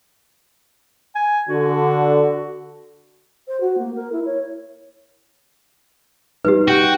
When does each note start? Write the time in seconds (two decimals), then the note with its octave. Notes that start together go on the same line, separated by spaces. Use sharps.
1.15 G#5
1.48 D3 F#4
3.48 C5
3.61 F#4
3.78 A#3
3.95 A#4
4.12 E4
4.25 C#5
6.45 G3 D#4 G4 B4
6.68 F#4 G5